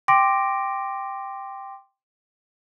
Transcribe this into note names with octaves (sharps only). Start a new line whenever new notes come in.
G5 C6 D6 A#6 D7